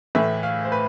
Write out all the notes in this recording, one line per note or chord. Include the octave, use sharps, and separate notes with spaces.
A2 E3 A3 E5
F5
C5
B4